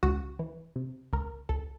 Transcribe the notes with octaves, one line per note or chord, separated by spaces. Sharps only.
C#2 F#4
E3
C3
C#2 A#4
C#2 A4